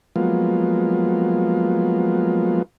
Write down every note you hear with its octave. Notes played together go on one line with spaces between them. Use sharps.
F3 F#3 G#3 A#3 B3 F4